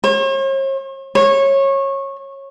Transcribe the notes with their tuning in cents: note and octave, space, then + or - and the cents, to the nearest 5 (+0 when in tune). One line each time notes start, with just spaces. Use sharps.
C#5 -45
C#5 -20